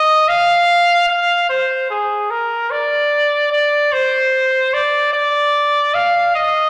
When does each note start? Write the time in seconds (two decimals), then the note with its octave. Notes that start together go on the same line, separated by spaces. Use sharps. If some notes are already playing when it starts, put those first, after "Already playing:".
Already playing: D#5
0.28 F5
1.09 F5
1.50 C5
1.90 G#4
2.31 A#4
2.71 D5
3.52 D5
3.92 C5
4.74 D5
5.14 D5
5.95 F5
6.35 D#5